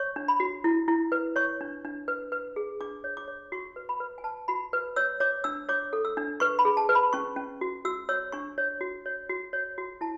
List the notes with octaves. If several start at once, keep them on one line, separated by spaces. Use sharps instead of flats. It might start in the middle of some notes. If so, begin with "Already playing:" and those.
Already playing: C#5 C#6
D4
B5
F#4
E4
E4
B4
C#5 C#6
D4
D4
B4
B4
G#4
D4 D6
C#5
D6
C#5
F#4 C#6
B4
B5
B4
G#5
B4 A5
F#4 B5
B4
C#5 E6
C#5 D6
D4 E6
C#5 D6
A4
E6
D4
B4 C#6
B5
G#4
A5
B4
B5
C#4 C#6
C#4
F#4
F#4 E6
C#5 E6
D4 C#6
C#5
F#4
C#5
F#4
C#5
F#4
E4 A5